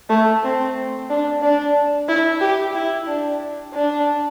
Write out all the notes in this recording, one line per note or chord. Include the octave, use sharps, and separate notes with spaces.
A3
C4
D4
D4
E4
G4
E4
D4
D4